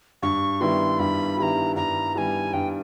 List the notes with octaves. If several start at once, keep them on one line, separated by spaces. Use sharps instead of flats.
G2 C#6
D#3 G3 B3 E4 C6
G2 B5
D#3 G3 B3 E4 A#5 B5
G2 A#5
D#3 G3 B3 E4 G#5 A#5
G2 G5